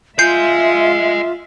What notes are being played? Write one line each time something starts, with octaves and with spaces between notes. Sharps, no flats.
F4 D#5 E5 G#5 G6 C7